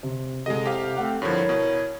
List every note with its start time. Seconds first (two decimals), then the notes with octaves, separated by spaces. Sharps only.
0.03 C3
0.46 C2 G#3 A4 D#5
0.66 C3 G4 F5
0.97 A3 C4 F#5
1.22 G2 D3 F3 A#3 E4 C#5
1.49 B2